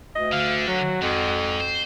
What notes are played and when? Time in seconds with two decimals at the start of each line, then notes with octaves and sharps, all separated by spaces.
0.15 D2 D#5
0.33 D3 F5
0.67 F#3 F#4
1.02 F2 G#2
1.60 C5